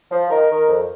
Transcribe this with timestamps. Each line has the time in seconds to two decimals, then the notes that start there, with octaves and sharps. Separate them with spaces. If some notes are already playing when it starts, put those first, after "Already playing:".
0.11 F3
0.30 D#3 A#4
0.50 D#3
0.69 F2